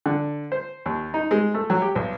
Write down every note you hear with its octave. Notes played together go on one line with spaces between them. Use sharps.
D3
C5
D#2
D#4
G#3
A3
F#3
G4
B1